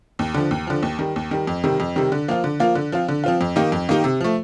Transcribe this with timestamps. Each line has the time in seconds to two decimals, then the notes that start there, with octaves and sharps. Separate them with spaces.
0.19 D#2
0.34 D3 F3
0.51 D#2
0.67 D3 F3
0.83 D#2
0.99 D#3 G3
1.16 D#2
1.31 D#3 G3
1.47 F2
1.64 C3 D#3 G3
1.80 F2
1.96 C3 D#3 G3
2.12 D3
2.28 F3 A#3 F4
2.44 D3
2.60 F3 A#3 F4
2.75 D3
2.92 F3 C4 F4
3.08 D3
3.24 F3 C4 F4
3.41 F2
3.56 D#3 A#3 D#4 G4
3.72 F2
3.89 D#3 A#3 D#4 G4
4.04 C3
4.21 F3 A3